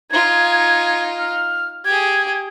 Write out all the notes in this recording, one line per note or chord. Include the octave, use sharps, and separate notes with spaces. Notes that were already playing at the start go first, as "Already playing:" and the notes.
D#4 F4 G#6
F6
G4 G#4 G#6